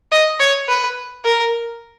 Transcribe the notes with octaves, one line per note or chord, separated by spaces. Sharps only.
D#5
C#5
B4
A#4